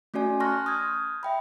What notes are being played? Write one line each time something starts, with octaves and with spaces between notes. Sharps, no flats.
A3 C#4 F#4 D5 G#5
A5 C6 C#6 F6 F#6 A#6
D#6 F6 G6 G#6
E5 G5 B5